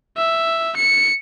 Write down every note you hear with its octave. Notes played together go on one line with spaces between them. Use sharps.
E5
C#7